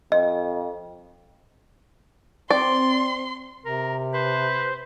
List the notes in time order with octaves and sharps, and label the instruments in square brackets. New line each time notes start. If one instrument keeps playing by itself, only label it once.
[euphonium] F2 [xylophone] D#5
[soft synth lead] C4 [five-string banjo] D5 [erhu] C6
[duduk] C3 [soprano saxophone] A#4
[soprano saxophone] B4 [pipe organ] C5